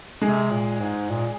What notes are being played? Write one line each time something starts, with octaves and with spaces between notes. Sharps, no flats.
C3 G#3 G#4
A#2
G#2
A#2